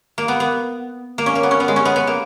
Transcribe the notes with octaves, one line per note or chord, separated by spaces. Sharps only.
A#3
B3
B3
A#3
C#4
A#3
B3
C#4
B3
G#3
C#4
B3
B3
A#3